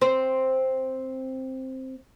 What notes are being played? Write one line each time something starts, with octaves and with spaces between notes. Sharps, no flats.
C4 C5